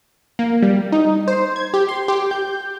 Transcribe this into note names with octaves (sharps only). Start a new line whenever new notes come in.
A#3
G3
D#4
C5
G#6
G4
C6
G4
G6